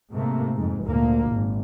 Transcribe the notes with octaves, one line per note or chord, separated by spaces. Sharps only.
G#2 C3 A3 A#3
F2 G#2
D2 A#2 A#3
G#1